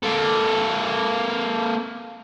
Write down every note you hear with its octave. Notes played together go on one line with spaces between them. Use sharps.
A#3 A4